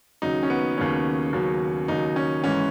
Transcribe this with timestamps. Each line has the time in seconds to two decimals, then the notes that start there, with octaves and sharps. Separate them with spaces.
0.22 D#2 C#3 F#3 D#4
0.43 C#4
0.50 B3
0.77 D#2 C#3 F#3 C#4
1.33 D#2 C#3 F#3
1.88 D#2 C#3 F#3 D#4
2.16 C#4
2.44 G#2 E3 G#3 C#4